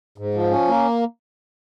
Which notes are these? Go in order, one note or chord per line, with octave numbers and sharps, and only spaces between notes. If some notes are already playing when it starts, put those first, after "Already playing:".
G#2
F3
C#4
A#3